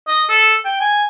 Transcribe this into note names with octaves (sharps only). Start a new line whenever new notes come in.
D#5
A4
G5
G#5